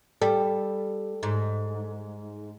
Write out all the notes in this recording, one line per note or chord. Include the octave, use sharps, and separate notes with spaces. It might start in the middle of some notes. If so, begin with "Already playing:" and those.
G3 A4
G#2